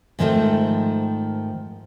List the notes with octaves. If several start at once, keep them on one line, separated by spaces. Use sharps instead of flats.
G#2 D#3 F3 G3 A3 C4